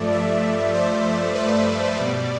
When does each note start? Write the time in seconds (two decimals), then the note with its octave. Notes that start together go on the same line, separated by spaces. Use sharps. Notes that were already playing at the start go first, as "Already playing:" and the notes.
Already playing: G2 F3 A3 D5
0.12 E5
0.74 C5
1.35 B4
1.97 B2 G3 D5